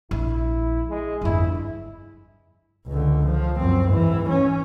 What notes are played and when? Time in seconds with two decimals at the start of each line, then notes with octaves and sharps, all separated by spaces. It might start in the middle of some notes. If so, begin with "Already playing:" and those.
0.11 A#1 E4
0.89 G#3
1.21 G1 F2 E4
2.87 C#2 D3
3.26 F3
3.59 F#2 C4
3.88 G#2 E3
4.29 C#4